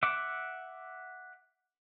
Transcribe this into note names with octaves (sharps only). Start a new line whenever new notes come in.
E5 F#5 D6